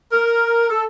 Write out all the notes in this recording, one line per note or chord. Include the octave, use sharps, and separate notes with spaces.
A#4
A4